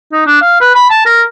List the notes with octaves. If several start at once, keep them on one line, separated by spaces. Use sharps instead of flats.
D#4
D4
F5
B4
B5
A5
A#4